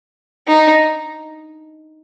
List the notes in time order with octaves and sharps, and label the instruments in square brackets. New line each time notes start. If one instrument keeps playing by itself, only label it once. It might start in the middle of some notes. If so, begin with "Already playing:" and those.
[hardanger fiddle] D#4